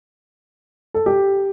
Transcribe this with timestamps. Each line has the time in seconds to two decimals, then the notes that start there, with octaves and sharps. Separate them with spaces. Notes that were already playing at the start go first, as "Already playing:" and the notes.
0.94 A4
1.06 G4